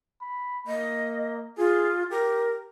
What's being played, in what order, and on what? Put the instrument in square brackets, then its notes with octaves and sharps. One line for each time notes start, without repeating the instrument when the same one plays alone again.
[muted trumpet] B5
[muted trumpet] A#3 [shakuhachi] D#5
[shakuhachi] F4 [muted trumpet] G#4
[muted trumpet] G4 [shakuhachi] A#4